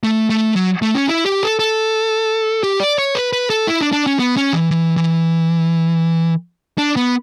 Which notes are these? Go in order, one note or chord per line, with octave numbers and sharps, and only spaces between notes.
A3
A3
F#3
A3
C#4
E4
G4
A4
A4
G4
D5
C#5
B4
B4
A4
E4
D4
D4
C#4
B3
C#4
E3
E3
E3
D4
B3